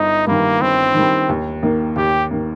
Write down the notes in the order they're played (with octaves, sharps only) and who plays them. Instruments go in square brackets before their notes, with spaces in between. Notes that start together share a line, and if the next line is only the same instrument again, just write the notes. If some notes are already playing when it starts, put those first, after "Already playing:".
Already playing: [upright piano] G1 [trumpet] D#4
[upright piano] G2 D#3 [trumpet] A#3
[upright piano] G1 [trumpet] C4
[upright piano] G2 D#3
D#2
D#3 A#3
[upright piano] D#2 [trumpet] G4
[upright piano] D#3 A#3